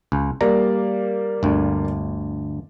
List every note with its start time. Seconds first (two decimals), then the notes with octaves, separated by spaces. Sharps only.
0.12 C#2
0.41 G3 A#3 D5 A#5
1.43 G1 D2